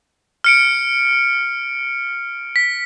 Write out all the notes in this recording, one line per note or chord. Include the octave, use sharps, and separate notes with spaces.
F6 C#7 D7
B6